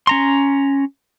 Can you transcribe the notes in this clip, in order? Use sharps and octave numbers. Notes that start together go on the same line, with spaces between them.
C#4 A#5 C6